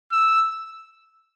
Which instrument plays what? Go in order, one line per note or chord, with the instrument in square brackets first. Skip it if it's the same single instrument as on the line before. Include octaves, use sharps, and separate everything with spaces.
[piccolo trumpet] E6